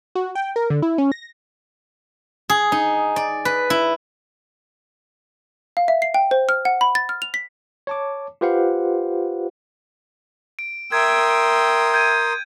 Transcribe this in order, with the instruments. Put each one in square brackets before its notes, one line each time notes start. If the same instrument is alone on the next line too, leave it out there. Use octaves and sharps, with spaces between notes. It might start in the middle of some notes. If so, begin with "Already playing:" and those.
[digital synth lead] F#4
G5
A#4
D3
E4
C#4
A#6
[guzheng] G#4
D#4
D5
B4
E4
[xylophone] F5
E5
C7
G5
C5
F6
F#5
B5
A6
F6
F7
B6
[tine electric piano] C#5 A5 D6
F4 G4 B4 C5 F5 F#5
[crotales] D7
[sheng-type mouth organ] A#4 C6 D#6 [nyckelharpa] E5 G5 [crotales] G#6
[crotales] G6 G#6 D#7